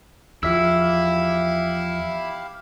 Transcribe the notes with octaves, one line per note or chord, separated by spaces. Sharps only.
E2 F3 E4 G4 E5 F5 E6